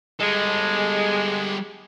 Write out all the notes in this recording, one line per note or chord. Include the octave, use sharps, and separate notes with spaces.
G3 G#3 A4